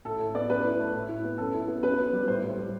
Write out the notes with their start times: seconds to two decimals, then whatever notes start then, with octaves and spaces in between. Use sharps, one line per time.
0.05 A2 A4
0.19 A2
0.35 B3 D5
0.49 F#2 B4
0.64 E4
0.79 A3
0.94 A2
1.09 E4
1.24 B3
1.38 F#2 A4
1.54 E4
1.68 B3
1.82 F#2 B4
1.98 B3
2.13 G3
2.28 A2 C5
2.42 A2
2.57 G3